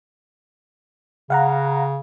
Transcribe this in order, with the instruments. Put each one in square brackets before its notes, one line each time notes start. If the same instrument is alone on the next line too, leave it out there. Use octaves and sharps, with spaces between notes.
[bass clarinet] C#3 [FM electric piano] F5 F#5 A#5